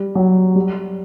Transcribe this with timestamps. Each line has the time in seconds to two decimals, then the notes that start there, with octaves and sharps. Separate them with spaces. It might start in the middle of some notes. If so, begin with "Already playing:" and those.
Already playing: G3
0.15 F#3
0.55 G3